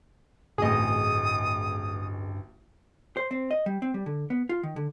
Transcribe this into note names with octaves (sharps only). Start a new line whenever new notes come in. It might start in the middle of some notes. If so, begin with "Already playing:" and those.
D1 A1 G2 G#4 D#5 D#6
C5
C4
D#5
G3
C4
G3
D3
B3
F4
D#3
D3